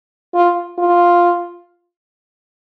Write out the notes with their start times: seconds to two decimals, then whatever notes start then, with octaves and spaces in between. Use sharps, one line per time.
0.34 F4
0.78 F4